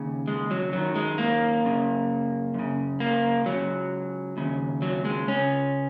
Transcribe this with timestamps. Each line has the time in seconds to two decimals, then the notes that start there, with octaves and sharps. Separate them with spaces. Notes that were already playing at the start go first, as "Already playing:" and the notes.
Already playing: D#2 C#3
0.28 G#3
0.51 F#3
0.73 F#2 D#3 F#3
0.95 G#3
1.18 A#3
1.64 F#2 C#3
2.54 F#2 C#3
3.00 A#3
3.46 C#2 C#3 F#3
4.37 D#2 C#3
4.82 F#3
5.05 G#3
5.28 C#2 C#3 C#4